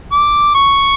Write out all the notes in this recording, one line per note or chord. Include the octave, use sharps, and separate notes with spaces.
D6
C#6